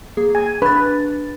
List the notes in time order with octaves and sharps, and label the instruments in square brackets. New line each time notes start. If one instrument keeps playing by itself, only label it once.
[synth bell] A#3 G#4
[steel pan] G#5
[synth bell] D4 A6 [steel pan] B4